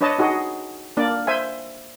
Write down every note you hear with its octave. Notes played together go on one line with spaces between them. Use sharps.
D4 B4 C#5 D#5 A5
D#4 F#4 G#4 D#5
A#3 D4 D5
C5 E5 G#5